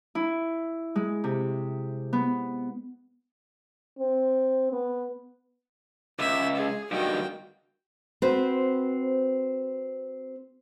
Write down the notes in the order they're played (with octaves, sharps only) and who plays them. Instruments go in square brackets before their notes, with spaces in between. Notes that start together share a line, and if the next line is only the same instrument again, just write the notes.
[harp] E4
G#3
C3
B3
[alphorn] C4
B3
[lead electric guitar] C#2 [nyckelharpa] E5
[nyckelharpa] G#4
[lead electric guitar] G2 D#3 [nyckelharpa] F#4 G5
[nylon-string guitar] C4 F#4 B4 C5